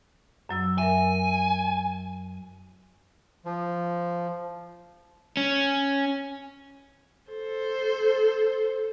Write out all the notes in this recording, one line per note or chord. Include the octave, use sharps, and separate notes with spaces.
F#2 F#3 E6
A#4 E5 G#5
F3
C#4
A4 C5